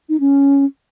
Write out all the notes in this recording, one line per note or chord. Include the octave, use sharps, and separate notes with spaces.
D#4
C#4